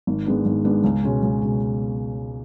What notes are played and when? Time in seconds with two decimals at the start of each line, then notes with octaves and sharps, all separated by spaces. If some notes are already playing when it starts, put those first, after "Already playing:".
0.07 G#1
0.26 G#2 G#3 B3 D4
0.45 G#1
0.65 G#2 G#3 B3 D4
0.84 C#2
1.03 B2 G#3 C#4
1.22 C#2
1.42 B2 G#3 C#4